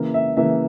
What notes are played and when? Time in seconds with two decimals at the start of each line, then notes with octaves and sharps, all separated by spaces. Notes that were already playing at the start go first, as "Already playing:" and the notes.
Already playing: C#3 E3 A#3
0.14 E5
0.37 C#3 E3 A#3 E5